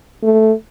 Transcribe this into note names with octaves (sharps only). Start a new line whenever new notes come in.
A3